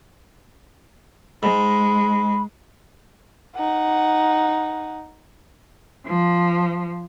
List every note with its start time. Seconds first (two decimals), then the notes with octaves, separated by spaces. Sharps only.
1.43 G#2 G#3 B5
3.56 D#4 F#5
6.05 F3